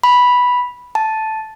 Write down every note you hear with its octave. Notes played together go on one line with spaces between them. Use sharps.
B5
A5